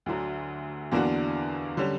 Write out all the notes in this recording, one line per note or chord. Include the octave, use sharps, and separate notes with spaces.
D2 D3 F#3
E2 D3 A#3 D4 F#4
D3 G3 C#4